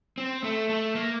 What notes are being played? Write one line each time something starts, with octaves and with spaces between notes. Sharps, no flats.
C4
A3
A3
A#3